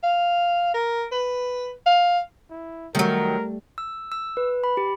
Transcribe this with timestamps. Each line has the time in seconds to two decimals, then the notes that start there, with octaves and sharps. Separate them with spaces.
0.03 F5
0.74 A#4
1.12 B4
1.86 F5
2.50 E4
2.95 D#3 F#3 G3 A3 A#4
3.78 E6
4.12 E6
4.37 B4
4.64 B5
4.77 G4